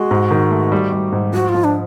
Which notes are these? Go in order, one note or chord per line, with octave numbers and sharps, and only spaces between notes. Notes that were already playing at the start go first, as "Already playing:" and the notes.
Already playing: G#3 F#4
G#2
D#3
A3
G3
G3
G#2
F3 F#4
F4
F3
D4